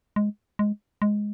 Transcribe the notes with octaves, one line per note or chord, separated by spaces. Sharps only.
G#3
G#3
G#3